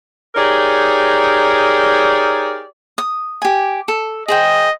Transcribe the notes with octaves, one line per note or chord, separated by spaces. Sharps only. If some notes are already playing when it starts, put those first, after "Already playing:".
D#4 G4 G#4 A#4 C#5 D5
D#6
G4 G#5
A4
G#4 C5 D#5 G5